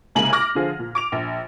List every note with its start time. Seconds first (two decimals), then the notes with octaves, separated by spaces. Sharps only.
0.15 C2 C#3 G#3 A#3 G#5 F#7
0.33 D6 F6 A#6
0.55 D3 F3 F4 G#4 C5
0.79 A#2
0.95 D6 D7 F7
1.12 A#1